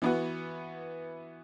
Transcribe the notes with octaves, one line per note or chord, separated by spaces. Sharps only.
E3 B3 F#4